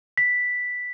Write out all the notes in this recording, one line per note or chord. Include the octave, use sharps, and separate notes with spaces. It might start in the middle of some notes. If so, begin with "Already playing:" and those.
B6